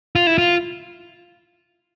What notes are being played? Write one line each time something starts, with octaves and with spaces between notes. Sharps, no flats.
F4
E4
F4